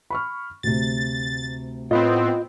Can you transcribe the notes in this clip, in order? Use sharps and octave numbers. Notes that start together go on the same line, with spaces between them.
B5 C#6 F6
D2 C3 A6
A2 B3 C4 F4 D#5